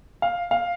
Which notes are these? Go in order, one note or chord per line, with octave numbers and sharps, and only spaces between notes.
F5
F5